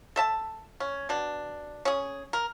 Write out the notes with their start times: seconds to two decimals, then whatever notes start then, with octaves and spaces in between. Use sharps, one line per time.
0.16 A4 E5 A5
0.80 C#4
1.09 B2 D4
1.85 C#4 G#4
2.33 A#4